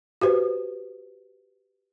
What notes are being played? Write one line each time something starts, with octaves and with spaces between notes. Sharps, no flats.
F#4 G4 B4 C5